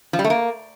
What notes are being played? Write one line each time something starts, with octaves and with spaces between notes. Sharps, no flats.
F3
G3
A3
A#3